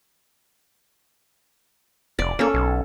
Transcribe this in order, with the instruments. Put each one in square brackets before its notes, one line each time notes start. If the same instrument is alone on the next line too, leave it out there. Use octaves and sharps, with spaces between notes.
[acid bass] F1 [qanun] D5
[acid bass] A#3 [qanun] C#4 A4
[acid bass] B1